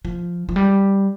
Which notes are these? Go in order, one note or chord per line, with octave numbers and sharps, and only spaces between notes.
F3
F3
G3